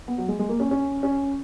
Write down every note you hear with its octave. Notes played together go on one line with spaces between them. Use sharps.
B3
F#3
G#3
G#3
A#3
C#4
C#4
C#4